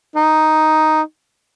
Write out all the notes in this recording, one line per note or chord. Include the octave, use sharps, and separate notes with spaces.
D#4